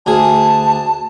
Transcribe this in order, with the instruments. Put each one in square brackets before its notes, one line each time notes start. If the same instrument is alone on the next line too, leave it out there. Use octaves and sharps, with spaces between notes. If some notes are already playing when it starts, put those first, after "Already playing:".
[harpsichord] D2 G#4 [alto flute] A5